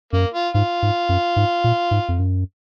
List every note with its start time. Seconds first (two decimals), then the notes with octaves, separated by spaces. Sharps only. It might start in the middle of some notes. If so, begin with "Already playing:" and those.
0.13 F#2 A#3
0.34 F4
0.54 G#2 F4
0.83 G#2
1.09 F#2
1.36 G#2
1.64 A#2
1.91 G#2
2.09 F2
2.19 F#2